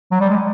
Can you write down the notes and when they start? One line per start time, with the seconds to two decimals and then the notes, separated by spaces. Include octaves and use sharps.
0.12 F#3
0.21 G3
0.30 G#3